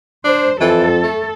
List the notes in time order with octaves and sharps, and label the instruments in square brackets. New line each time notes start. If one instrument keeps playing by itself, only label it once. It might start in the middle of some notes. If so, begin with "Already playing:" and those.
[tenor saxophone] D4 [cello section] C5
[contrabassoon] F2 [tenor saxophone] E3 [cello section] A4
[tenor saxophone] A3